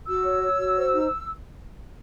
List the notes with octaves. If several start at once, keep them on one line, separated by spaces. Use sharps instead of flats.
F#4 E6
C#5
C#5
F#4
C5
D#4